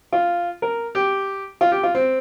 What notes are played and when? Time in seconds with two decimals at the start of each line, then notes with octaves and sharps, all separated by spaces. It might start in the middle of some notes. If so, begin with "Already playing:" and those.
0.12 F4
0.62 A#4
0.95 G4
1.61 F4
1.72 G4
1.83 F4
1.95 C4